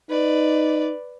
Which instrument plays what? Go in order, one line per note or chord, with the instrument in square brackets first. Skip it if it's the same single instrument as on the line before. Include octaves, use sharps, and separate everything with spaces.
[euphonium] D#4 [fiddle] B4 D5